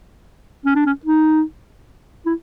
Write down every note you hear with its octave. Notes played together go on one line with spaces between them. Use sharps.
C#4
D4
C#4
D#4
E4